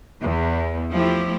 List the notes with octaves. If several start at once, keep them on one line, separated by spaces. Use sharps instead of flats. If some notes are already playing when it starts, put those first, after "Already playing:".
E2
F3 A3 E4 G4